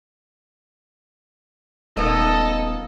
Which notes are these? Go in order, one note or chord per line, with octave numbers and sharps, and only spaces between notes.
D#1 A#3 B3 D#4 A4 D#5